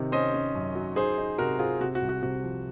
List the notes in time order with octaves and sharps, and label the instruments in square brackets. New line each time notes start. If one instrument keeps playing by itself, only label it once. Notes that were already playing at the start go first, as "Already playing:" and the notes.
Already playing: [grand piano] C3 D#3
C#4 C5 D#5
C#4
F#2
F#3
D#4 G#4 C5
D#4
C3 F#4 A#4
C4 F4 G#4
C3 F#4
F#4
C2
F#4
C3 F#4
F3